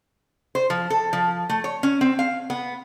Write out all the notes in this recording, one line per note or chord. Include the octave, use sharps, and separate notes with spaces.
C5
F3
A4
F3
A3
C#5
C#4
C4
F5
B3